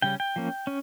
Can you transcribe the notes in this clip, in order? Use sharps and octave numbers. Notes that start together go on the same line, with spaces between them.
C#3 G3 C#4 G5
G5
F3 A#3 C#4
C#4